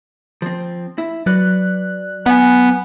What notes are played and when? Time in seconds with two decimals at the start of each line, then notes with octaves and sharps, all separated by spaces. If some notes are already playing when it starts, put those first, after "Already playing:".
0.42 F3 C4
0.98 E4
1.26 F#3 B4 D5 F#6
2.26 B3 F#5 G#5